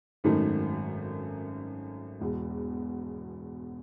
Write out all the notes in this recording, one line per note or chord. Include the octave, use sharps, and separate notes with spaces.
G#1 F#2 D#3 A3 D#4
E1 E2 B2